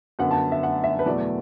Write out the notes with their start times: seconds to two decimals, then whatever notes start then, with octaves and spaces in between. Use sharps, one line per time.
0.19 F#2 D3 B3 F#5
0.31 A5
0.52 E5
0.63 F#5
0.84 E5
0.99 B4
1.06 E2 B2 F#3 A3 D5